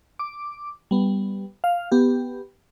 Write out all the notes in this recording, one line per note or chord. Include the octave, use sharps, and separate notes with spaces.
D6
G3 B3
F5
B3 G4